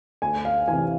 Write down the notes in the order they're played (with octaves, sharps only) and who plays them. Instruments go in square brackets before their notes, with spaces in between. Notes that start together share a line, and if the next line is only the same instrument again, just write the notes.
[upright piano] D2 G#5
F5
C3 E3 G#5